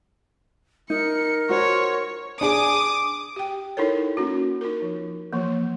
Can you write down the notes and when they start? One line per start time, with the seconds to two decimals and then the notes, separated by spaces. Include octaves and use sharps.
0.90 D#4 A#4 C#7
1.49 F#4 C5 C#5
2.41 D4 G#4 G#5 D6 D#6
3.36 G4 G5
3.77 D#4 E4 A4 A#4 C#5
4.17 A#3 C#4 F#4
4.61 D#4 F4 A#4
4.82 F3
5.33 E3 F3 A#3